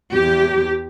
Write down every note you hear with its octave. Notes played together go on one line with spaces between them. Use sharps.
E2 G4